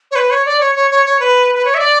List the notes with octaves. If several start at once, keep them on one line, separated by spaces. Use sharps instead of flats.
C#5
B4
C#5
D5
C#5
C#5
C#5
C#5
B4
B4
C#5
E5
D5